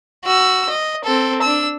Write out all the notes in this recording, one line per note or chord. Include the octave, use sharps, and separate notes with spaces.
F#4 E6
D#5
C4 A4
D4 E6